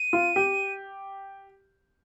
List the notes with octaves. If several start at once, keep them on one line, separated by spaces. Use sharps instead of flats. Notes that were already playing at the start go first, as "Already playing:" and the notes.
Already playing: D#7
F4
G4